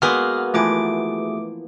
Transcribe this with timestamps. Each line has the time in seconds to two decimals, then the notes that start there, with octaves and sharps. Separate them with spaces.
0.02 G#3 A#3 B3 F#4 G#4 D#6 F6
0.54 E3 F3 A3 D6 D7